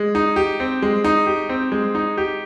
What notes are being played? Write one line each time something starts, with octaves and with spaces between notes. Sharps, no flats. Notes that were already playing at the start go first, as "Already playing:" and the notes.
Already playing: G#3
D#4
G4
C4
G#3
D#4
G4
C4
G#3
D#4
G4